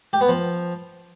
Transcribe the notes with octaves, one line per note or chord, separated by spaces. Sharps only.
G4
B3
F3